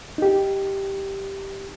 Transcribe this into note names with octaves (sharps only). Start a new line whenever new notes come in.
D#4 G4